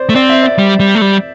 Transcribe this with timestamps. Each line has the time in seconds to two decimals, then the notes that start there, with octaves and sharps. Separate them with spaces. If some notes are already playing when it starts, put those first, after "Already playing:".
Already playing: C5 D5
0.09 A3
0.15 C4 D5
0.29 E5
0.43 D5
0.58 G3
0.80 G3
0.95 A3
1.01 G3